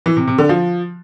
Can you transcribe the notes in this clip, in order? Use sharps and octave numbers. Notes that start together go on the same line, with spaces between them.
E3
C3
C3
D3
F3